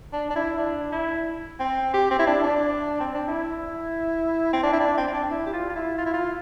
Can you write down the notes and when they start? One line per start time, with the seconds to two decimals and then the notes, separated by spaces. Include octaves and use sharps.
0.13 D4
0.30 D4
0.36 E4
0.58 D4
0.92 E4
1.60 C4
1.94 G4
2.11 C4
2.19 E4
2.27 D4
2.44 D4
3.00 C4
3.15 D4
3.28 E4
4.53 C4
4.63 D4
4.73 E4
4.80 D4
4.97 C4
5.08 C4
5.13 D4
5.31 E4
5.46 G4
5.53 F4
5.69 F4
5.76 E4
5.98 F4
6.06 E4
6.14 F4